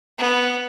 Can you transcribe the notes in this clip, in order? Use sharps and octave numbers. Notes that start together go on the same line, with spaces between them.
B3